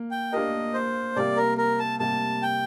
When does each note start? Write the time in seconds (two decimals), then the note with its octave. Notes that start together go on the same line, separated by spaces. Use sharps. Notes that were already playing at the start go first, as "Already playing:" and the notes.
Already playing: A#3
0.11 G5
0.33 A#3 D4 G4 A#4 D#5
0.74 C5
1.16 C3 G3 A#3 D5
1.37 A#4
1.58 A#4
1.80 A5
1.99 C3 G3 A#3 A5
2.42 G5